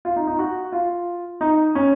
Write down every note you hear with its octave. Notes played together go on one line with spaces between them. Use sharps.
F4
D#4
D#4
F#4
F4
D#4
C#4